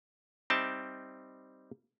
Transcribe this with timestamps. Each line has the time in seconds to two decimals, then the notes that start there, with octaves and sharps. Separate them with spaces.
0.50 G3 C4 D#4 E5 G5 A5